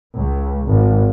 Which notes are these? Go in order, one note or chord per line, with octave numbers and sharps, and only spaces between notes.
C#2
G#1